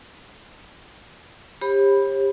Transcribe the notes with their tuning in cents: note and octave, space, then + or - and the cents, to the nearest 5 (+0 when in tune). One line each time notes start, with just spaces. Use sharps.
G4 +25 C#5 -45 B5 +0